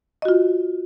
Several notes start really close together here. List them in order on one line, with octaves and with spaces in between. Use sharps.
D#5 F#4 F4